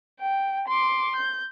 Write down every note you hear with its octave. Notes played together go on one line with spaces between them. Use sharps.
G5
C6 D6
G6